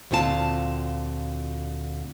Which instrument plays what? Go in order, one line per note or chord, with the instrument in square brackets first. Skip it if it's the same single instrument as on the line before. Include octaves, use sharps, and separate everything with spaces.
[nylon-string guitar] D2 A#2 C4 F4 F#4 A5